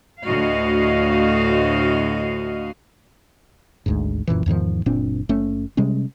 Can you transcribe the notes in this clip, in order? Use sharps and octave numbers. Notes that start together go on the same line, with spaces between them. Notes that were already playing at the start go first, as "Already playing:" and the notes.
D2 A2 F#4 D#5 F5
G#1 D2 G#2
D#1 F#2 A#2 E3
E2 G#2 D#3 F3
F#1 A#2 C4 D4
F#1 A3 C#4
C3 G3 G#3 C#4